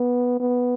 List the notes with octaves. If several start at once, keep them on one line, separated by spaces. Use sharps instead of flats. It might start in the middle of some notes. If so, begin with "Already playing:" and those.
Already playing: B3
B3